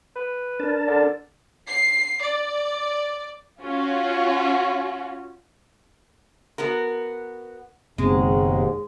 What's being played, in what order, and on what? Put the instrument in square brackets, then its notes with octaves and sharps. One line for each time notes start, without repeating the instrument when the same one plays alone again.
[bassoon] B4
[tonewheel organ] D4 A#4 A5
[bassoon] D3
[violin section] C7
D5
[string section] C#4 F4 F#4
[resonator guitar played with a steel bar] B3 F#4 A#4
[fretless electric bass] F#1 B2 C4 [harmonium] D#2 G#2 [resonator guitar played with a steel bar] G#3